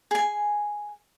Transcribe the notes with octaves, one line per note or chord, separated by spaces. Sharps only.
G#4 G#5